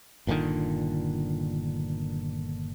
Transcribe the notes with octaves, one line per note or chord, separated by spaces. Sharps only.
G1 A#2 D3 D#3